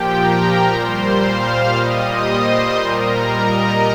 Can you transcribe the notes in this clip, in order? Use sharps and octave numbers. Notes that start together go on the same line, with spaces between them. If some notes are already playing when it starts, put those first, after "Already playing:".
Already playing: A#2 F3 G4 G5
A#4 A#5
A#2 G3 C5 C6
F5 F6
A#2 G3 D#5 D#6
C5 C6
A#2 G3 A#4 A#5
D#5